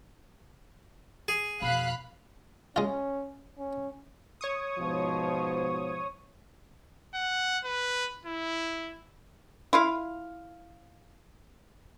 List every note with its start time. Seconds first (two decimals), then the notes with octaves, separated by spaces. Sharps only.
1.28 G#4
1.62 F2 B2 F5 B5 F#6
2.76 G#3 C#4 F4
3.58 C#4
4.41 C#5 C#6 D#6
4.79 G#2 B2 F3
7.15 F#5
7.65 B4
8.26 E4
9.73 E4 F4 F5